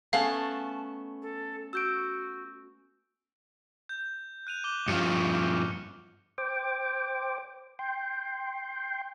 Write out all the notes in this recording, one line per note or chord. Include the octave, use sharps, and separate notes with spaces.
A3 B3 C#4 F5 A5
A4
F#4 E6 G6 D7
G6
F#6 D#7 F7
D6 F#6 G7
G2 F3 C#6 F6 C#7
C5 G5 D6
G5 C6